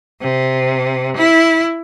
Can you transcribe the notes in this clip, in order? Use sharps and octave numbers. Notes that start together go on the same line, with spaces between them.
C3
E4